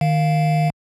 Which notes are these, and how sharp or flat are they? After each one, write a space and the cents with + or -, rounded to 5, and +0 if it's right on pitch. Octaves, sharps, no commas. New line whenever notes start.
D#3 -10 F5 +0